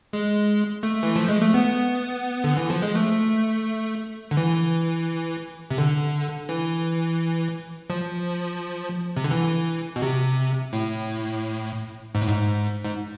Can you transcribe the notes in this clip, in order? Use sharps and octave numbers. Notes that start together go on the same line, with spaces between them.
G#3
A3
E3
F3
G#3
A3
B3
D3
E3
F3
G#3
A3
D3
E3
C3
D3
E3
F3
C3
D3
E3
B2
C3
A2
G#2
A2
G#2
G#2